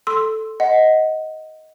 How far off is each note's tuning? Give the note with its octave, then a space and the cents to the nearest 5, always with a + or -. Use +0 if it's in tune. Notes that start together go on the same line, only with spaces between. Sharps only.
A4 +0 C6 +5 E6 +0
D#5 +10 F#5 +0